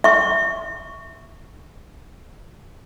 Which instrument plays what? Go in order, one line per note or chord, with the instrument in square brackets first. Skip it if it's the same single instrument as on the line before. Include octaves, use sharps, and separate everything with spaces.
[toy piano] E5 C#6